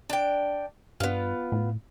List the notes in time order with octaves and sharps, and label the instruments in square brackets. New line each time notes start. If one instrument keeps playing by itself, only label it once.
[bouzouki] D4 G5
[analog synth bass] G2 [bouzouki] B3 F4
[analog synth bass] A2